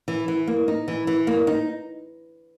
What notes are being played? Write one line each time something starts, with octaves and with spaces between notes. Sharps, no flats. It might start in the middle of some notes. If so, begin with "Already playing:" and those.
E3
E3
A#3
D#4
E3
E3
A#3
D#4